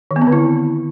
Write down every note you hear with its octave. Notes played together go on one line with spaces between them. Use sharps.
D#3
B3
C4
D3
E4